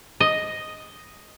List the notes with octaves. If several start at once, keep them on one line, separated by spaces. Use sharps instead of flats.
D#5